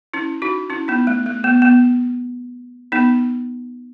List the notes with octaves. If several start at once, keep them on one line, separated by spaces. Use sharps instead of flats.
C#4 E4
D#4 F#4
C#4 E4
B3 D#4
A3
A3
B3
B3
B3 D#4